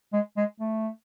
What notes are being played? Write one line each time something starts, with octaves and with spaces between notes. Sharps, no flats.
G#3
G#3
A3